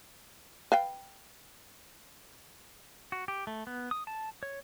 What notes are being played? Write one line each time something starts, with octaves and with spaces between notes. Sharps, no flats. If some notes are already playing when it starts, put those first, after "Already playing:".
B4 F5 G5
F#4
G4
A3
B3
D#6
A5
C#5